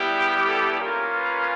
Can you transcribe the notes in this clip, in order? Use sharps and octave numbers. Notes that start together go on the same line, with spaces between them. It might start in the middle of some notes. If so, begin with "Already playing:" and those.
Already playing: G3 B3 E4 G4
G#4
A4
A#3 C#4 F4 A#4
B4